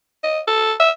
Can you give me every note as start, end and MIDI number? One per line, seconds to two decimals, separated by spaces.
0.24 0.40 75
0.47 0.73 69
0.80 0.90 76